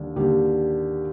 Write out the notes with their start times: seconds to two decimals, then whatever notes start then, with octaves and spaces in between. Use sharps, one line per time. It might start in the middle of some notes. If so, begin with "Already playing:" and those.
Already playing: D#2 D3 G3
0.16 D#2 D3 G3 G4